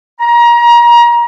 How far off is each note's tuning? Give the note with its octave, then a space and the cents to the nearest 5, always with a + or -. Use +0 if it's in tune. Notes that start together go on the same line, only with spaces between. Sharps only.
A#5 +30